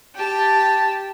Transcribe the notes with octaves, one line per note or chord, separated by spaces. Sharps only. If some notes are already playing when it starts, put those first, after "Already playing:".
G4 A5